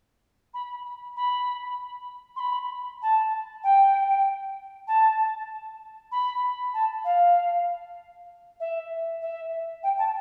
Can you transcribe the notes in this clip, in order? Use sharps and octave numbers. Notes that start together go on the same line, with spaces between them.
B5
B5
C6
B5
A5
G5
A5
B5
A5
F5
E5
E5
G5
A5